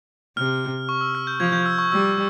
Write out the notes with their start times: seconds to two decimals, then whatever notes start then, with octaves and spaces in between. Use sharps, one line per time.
0.37 C3 F6
0.89 C#6
1.01 E6
1.15 F6
1.27 G6
1.40 F3 G#6
1.52 G6
1.66 E6
1.78 C#6
1.92 G3 E6